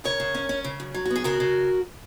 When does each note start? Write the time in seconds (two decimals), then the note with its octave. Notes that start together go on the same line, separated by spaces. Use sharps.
0.04 C#3 A#4 C#5
0.20 C#3
0.35 C#4
0.49 C#4
0.64 C#3
0.80 F#2
0.94 F#3
1.05 F#4
1.10 B3
1.16 G#4
1.24 C#3 F#4 A#4
1.40 C#3